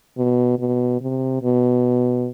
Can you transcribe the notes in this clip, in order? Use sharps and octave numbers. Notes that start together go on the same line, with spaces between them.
B2
B2
C3
B2